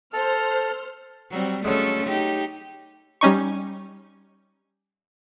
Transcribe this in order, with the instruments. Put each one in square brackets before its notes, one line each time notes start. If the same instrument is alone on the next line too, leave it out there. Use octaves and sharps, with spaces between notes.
[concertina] A4 [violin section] C5 F6
[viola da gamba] F#3 G3 C4
[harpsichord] F#3 G#3 [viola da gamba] A3 C#4 A4
[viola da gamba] D#4 G4
[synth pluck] G3 C#4 D#4 C#6